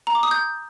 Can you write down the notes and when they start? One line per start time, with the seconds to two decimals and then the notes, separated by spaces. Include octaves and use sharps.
0.07 A#5
0.15 D6
0.23 D#6
0.31 G6